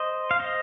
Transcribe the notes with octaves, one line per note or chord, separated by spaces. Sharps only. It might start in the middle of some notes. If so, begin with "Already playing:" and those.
Already playing: C5 D#5
F5
C5 D#5